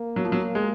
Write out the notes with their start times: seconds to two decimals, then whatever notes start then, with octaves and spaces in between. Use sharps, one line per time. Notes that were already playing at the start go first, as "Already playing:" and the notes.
Already playing: A#3
0.16 F#3
0.24 F3
0.32 F#3
0.55 G#3